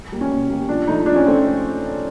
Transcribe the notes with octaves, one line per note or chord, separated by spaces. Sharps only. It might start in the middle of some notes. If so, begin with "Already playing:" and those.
G3 A#3
C#4
B2
G3 A#3
A#2 D4
F3 A3 D#4
A#2 D4
C#4
F3 A3 C4